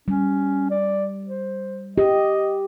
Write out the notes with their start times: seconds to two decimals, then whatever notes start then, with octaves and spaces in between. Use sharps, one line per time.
0.08 G3 C#4
0.70 D5
1.27 C5
1.98 G4 D#5